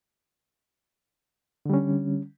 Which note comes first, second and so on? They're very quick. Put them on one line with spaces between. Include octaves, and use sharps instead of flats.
D3 G3 C#4